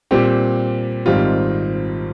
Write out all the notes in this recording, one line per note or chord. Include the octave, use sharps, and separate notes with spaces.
A#2 G3 C4 G4
G#1 G#2 G3 C4 F4